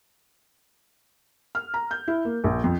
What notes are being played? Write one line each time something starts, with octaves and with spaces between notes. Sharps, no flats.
F6
A#5
G6
E4
A#3
A#1
F2